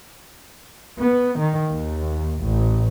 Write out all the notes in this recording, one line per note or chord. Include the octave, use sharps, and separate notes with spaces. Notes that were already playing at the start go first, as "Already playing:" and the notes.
B3
D#3
D#2
A1